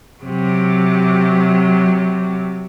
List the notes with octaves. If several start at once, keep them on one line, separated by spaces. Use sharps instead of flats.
C3 F#3